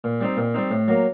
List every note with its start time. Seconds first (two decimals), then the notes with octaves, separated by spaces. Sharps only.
0.04 A#2
0.21 G3 C4 D#4
0.37 A#2
0.54 G3 C4 D#4
0.71 A2
0.88 F#3 A#3